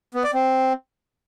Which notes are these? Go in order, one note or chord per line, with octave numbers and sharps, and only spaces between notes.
B3
D5
C4